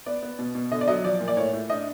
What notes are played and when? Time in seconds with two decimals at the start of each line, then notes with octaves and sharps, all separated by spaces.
0.06 B3 D5
0.23 B3
0.39 B2
0.55 B2
0.71 D3 D#5
0.81 D5
0.88 F#3 D#5
1.04 F3 D5
1.20 A#2
1.28 D5
1.37 A2 C#5
1.53 A2
1.70 D4 D#5